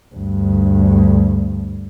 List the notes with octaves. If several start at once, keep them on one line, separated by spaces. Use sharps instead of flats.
D2 G2